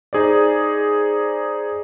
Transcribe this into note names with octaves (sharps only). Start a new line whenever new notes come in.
D#4 G#4 C5 D5